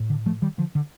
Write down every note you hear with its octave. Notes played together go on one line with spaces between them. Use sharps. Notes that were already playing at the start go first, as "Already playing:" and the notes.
Already playing: A2
D3
F3 A3
D#3 G3
D3 F3
D3